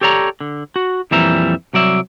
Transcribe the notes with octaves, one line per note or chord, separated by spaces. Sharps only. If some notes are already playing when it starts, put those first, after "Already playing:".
G4 A4 C#5 D5 A#5
D3
F#4
F2 A#2 E3 G3 E5 A#5
C2 F#3 D5 E5